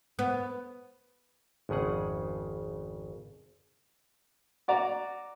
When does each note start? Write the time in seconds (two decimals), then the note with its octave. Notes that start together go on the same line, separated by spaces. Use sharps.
0.19 B3
1.69 G#1 F2 C#3 G#4 F#5
4.68 F#4 D5 A#5